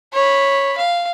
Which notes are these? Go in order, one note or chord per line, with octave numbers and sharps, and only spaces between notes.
C#5 B5
F5